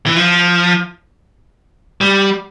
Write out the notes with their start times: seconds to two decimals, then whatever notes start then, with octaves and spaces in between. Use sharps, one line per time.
0.06 E3
0.16 F3
2.01 G3